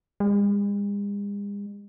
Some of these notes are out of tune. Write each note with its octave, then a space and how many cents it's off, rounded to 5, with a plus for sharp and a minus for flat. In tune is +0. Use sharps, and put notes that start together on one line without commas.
G#3 -45